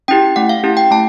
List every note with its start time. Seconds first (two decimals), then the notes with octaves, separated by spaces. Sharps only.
0.08 C#4 E4 G4 G5
0.36 A3 F#5
0.49 F5
0.64 C#4 E4 G4
0.77 G5
0.91 A3 A5